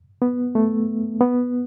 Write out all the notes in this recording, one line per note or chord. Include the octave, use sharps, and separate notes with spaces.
B3
A3
B3